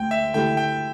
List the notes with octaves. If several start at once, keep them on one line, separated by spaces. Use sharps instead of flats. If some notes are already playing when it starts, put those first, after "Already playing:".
Already playing: D2 D3 G5
E5
D3 A3 E4 G4 G5
G5